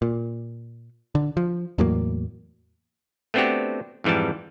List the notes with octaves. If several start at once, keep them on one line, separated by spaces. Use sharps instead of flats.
A#2
D3
F3
E2 A2 F#3 A#3
A3 B3 C4 D4 F#4 G4
F2 G#2 E3 G3 A5